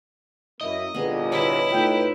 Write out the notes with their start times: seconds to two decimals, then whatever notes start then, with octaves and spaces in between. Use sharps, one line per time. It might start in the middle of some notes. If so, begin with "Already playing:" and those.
0.61 F#2 A#3 E4 D#5
0.94 G1 C2 A#2 B3 G#4
1.32 E4 C#5 G5
1.70 A2 D#4 F4 B4 G5